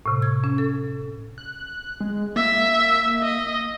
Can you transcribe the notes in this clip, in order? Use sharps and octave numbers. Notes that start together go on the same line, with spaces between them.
A2 C3
G#6
C#4
A4
F#6
G#3
A#3 E5
D#5